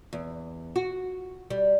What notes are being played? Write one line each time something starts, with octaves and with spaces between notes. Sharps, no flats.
E2
F#4
G3